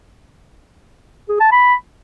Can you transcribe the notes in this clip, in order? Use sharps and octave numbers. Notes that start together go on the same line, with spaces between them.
G#4
A5
B5